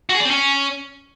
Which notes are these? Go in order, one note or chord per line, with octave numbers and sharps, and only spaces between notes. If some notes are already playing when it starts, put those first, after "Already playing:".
F#4
G#4
D5
C4
C#4